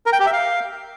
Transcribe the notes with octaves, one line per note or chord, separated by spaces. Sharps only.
A#4
G5
G4
E5
F5